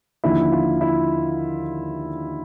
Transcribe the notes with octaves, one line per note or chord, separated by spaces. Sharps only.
D#2 D3 F3 E4
F4
E4